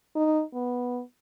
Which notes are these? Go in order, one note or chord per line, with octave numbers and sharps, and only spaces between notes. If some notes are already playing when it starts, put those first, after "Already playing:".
D#4
B3